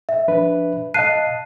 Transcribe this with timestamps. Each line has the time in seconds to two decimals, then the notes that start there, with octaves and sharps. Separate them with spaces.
0.09 E5
0.28 F3 D4 B4
0.94 D#5 F5 A5 F#6 C7 D#7